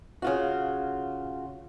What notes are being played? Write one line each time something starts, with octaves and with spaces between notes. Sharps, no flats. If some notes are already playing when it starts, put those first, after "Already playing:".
C#3 F4 F#4